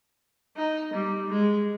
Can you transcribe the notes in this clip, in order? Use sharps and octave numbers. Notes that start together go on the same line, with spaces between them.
D#4
G3
G#3